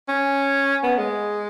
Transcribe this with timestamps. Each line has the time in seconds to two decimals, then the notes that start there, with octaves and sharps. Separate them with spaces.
0.08 C#4
0.83 B3
0.98 G#3